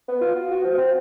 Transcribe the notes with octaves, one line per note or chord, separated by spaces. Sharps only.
B3
F4
F#4
F#4
F3
C4